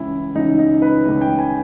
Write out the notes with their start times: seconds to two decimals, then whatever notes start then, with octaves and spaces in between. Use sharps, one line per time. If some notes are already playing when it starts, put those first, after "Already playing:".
Already playing: C#2 C#3 E3 E4
0.35 C#2 C#3 E3 D#4
0.59 D#4
0.82 B4
1.05 C#2 C#3 E3
1.21 G5
1.39 G#5